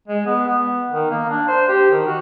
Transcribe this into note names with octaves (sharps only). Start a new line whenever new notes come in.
G#3
B3
B3
D#3
A#3
D4
C5
G4
D#3
F#4